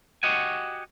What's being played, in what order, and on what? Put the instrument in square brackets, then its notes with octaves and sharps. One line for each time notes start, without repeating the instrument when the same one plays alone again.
[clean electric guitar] F#4 G4 D#5 F#5 G#5